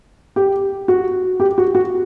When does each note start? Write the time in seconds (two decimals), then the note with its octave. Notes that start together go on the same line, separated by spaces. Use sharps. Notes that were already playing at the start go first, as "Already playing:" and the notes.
0.36 G4
0.88 F#4
1.40 G4
1.58 F#4
1.75 F#4